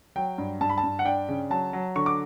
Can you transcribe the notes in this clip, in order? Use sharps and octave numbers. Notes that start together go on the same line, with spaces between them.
F#3 G5
G2
G2 A5
B5
A5
G2
F#5
D4 G5
C#3
F#3 A5
F#3
D3 C#6
D6